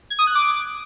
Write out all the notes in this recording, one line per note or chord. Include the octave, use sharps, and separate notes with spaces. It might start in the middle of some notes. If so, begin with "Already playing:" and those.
G#6
D#6
F#6
D6